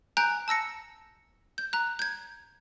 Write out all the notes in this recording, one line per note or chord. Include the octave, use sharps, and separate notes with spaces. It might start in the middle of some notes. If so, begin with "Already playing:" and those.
G#5 A#5 F#6 G6 D7
A5 E6 A#6 C#7
G6
A#5 F#6
G6 G#6